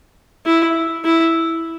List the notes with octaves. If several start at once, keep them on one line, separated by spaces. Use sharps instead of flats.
E4
E4